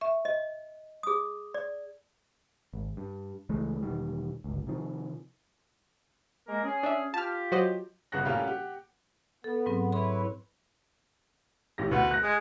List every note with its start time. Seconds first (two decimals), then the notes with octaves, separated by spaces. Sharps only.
0.01 E5 C#6
0.25 D#5
1.03 G#4 D#6
1.54 D5
2.74 G#1
2.97 G2
3.49 C#2 E3 G#3 A3
3.83 E1 D#3 G3
4.44 G1 C#2
4.67 C3 D#3 F3
6.48 G#3 A#3 A#4
6.64 C#4 G#4
6.83 D4 D5 E5
7.14 F4 G4 A5 F6
7.52 F#3 C5 D#5
8.12 G1 C#3 B3 F#5 F#6 A#6
8.25 A2 G3 A#3 C#4 F4 G4
8.44 G4 F#5
9.44 B3 A4
9.66 G#2 F#3 C4
9.92 E4 B4 C#5 B5 C6
11.78 A1 G4 A#6
11.91 D2 B3 F#4 B4 F#5
12.11 F#6 A#6
12.23 G#3